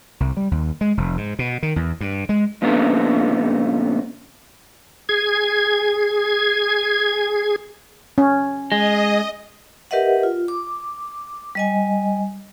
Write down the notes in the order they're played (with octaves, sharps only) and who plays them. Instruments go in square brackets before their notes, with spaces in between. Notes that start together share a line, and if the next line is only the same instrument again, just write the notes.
[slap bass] C2
G3
D#2
G#3
F1
G#2
B2
D#3
E2
G2
G#3
[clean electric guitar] F2 A#2 C#3 A3 B3 D4
[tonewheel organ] G#4 G#6
[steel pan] C#4
[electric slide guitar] G#3 [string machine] D#5
[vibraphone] G4 A#4 B4 D#5 E5 F#5
F4
D6
G3 D#5 G#5